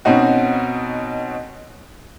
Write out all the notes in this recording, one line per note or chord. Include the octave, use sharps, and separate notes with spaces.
B2 C4 C#4 D#4 F#4